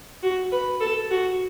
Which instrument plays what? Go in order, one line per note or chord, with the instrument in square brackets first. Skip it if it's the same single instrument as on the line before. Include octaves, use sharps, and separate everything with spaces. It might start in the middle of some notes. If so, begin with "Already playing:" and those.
[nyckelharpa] F#4
B4
A4
F#4